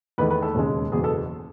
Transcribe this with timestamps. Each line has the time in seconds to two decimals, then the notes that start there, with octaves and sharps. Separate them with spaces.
0.18 E2 D#3 A3 D#4 B4
0.30 B4
0.42 A4
0.54 E1 D#2 C#3 G#3
0.92 F#1 E2 B2 G#4
1.04 A4